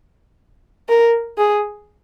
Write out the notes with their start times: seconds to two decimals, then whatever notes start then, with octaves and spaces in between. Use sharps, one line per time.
0.89 A#4
1.38 G#4